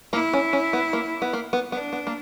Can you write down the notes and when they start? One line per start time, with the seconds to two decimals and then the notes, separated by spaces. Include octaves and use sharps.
0.13 A#3 E4
0.33 C#4
0.53 C#4
0.73 B3
0.93 A#3
1.22 B3
1.33 A#3
1.53 B3
1.72 B3 D4
1.93 B3
2.07 A#3